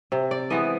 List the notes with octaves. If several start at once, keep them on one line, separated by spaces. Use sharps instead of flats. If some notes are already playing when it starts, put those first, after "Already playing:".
C3
D5
E3 G#3 B3 D#5